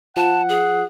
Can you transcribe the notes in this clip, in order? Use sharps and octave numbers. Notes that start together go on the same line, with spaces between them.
F3 F#5 A5
G#4